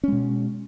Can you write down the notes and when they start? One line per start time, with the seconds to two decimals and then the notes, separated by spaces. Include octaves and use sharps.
0.04 C#4
0.08 G#3
0.12 B2